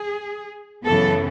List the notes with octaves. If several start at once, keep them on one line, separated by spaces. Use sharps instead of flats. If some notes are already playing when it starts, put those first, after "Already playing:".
Already playing: G#4
F#2 C#3 E3 B3 A4